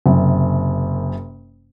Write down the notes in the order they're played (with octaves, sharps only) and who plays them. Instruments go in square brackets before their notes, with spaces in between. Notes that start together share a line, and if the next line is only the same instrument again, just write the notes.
[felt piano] F#1 F#2 C3